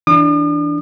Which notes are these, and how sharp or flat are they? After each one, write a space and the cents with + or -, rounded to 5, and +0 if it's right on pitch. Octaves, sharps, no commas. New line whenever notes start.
E3 +0 D4 +0 D#6 -45